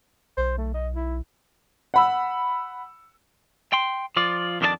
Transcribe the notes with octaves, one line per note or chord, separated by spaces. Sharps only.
B1 C5
A3
D#5
E4
F#5 B5 E6
G5 C6
F3 F4 D5
F2 D#3 D4 E4 D5 A5